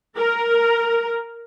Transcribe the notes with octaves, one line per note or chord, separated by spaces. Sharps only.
A#4